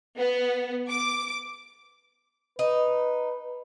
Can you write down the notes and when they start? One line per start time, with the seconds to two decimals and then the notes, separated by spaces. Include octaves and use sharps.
0.16 B3
0.90 D6
2.59 D#4 B4